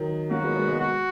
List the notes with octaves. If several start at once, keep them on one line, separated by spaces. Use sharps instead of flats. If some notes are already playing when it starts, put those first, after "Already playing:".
Already playing: D#3 F#3
F#3 A#3 F#4
G#3 B3
G#3 B3
G#3 B3
F#4